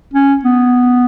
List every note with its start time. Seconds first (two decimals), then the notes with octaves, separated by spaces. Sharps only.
0.14 C#4
0.45 B3